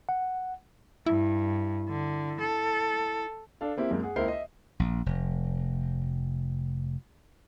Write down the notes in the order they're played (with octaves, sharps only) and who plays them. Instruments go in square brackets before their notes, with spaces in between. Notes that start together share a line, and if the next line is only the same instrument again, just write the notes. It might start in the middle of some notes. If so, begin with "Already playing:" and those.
[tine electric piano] F#5
[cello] G2 [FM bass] E4
[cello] D3
A4
[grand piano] D4 A4 F5
A#3 C4 E4 G4
F#2 G#3 A#3
G#4 F#5
C#2 A#3 E4 A#4 C5 C7
D#5 E5
[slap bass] A#1
F1